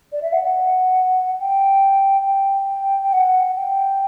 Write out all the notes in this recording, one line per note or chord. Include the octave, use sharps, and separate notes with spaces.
D5
E5
F#5
F#5
G5
G5
G5
F#5
G5